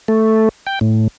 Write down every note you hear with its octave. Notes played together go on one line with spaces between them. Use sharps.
A3
G5
A2